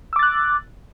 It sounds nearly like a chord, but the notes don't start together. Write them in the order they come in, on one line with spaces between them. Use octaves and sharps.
E6 D6 A6 F#6